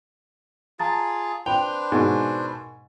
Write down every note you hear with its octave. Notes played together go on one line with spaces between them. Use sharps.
F4 G#4 A5 A#5 A6
D4 B4 C5 G5 F7
G#2 B2 A#4 G#5 C#6